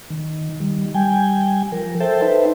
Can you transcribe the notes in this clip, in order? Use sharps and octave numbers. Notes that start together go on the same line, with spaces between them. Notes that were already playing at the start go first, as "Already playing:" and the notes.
D#3
D#3 G3
G3 G5 G#5
F3 A#4
A4 C5 E5 G5 A5
D#4 B4 C5 E5